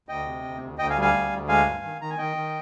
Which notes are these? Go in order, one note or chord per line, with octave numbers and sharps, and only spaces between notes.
D2 D#5 G5
C3
D2
D2
D2 D#5 G5
F5 G#5
G3
F5 G#5
D2
D2
G#3 F5 G#5
G2
D#3
D#3 A#5
G#5
D#3 D#5 G5
D#3